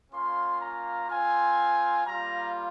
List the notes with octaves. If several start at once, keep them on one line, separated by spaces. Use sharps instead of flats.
A#3 C#4 F4 C6
A#5
C4 F4 G#5
G3 A#3 F4 A#5